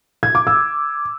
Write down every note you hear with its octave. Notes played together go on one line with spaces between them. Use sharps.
G#6
D6
E6